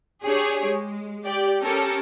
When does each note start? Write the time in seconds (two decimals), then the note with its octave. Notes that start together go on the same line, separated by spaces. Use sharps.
0.24 D4 G4 G#4 C#5
0.66 G#3
1.24 G4 D5 G5
1.61 C#4 G4 A4 A#4